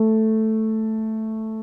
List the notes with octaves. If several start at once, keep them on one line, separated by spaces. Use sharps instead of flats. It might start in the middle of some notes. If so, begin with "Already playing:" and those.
Already playing: A3